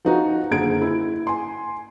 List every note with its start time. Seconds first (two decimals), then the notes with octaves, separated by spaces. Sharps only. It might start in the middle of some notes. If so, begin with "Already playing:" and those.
0.05 F3 D#4 F#4
0.51 F#1 D3 G#4 G#6 D7
0.82 E4
1.27 G#5 C6